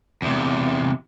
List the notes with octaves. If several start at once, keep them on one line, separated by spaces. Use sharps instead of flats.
E2 C3